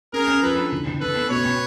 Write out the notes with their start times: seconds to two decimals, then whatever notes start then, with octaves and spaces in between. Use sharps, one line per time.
0.13 C#4 G#4 A#4
0.27 C#4
0.42 F3 A4 B4
0.58 D4
0.72 E3
0.87 E3
1.01 E3 A4 B4
1.16 B3
1.30 B2 B4 C#5
1.45 B2